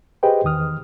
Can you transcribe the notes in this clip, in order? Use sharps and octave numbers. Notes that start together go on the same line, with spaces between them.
G4 G#4 B4 C5 D#5 G5
E2 D#3 D#6 F6